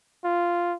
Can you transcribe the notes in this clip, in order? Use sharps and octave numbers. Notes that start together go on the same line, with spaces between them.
F4